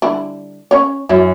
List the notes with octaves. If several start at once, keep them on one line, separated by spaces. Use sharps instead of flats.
D3 G3 E4
C#4 C#5
F#2 E4